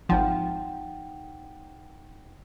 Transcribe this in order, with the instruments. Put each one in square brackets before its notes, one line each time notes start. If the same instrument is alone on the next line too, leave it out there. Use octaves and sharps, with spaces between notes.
[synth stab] G#1 F3 [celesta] D#4 F#5 G5